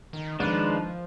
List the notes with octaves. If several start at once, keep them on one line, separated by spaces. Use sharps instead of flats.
D#3
D#3 F3 G#3 D4 F4 B4